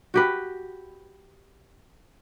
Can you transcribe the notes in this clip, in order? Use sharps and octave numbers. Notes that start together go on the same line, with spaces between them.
F#4 G4 B4